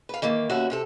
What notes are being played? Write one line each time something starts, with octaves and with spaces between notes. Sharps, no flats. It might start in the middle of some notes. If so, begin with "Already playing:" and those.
B4 F5
D#3 E3 A#3
D#2 B3 C#4 F#4 E5
C3 G4 A4